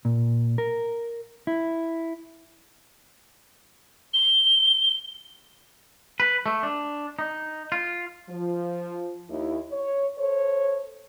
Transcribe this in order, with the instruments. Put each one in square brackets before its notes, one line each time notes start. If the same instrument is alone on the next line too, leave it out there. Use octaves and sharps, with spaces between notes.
[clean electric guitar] A#2
A#4
E4
[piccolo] G7
[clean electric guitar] B4
A3
D4
D#4
F4
[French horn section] F3
D#2 E4
C#5
A4 C5 C#5